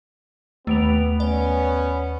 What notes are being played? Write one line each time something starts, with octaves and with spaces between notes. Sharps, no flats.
D#2 A3 B3 G4 D7 F7
B3 C#4 D5